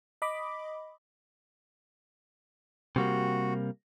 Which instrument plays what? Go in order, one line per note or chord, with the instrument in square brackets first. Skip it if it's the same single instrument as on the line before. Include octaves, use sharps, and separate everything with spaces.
[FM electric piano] D#5 B5 D6
[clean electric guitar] C3 G3 A#3 [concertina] F#4